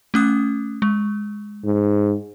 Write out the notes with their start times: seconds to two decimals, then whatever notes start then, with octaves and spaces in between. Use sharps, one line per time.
0.14 A3 C#4 D#6
0.82 G#3
1.65 G#2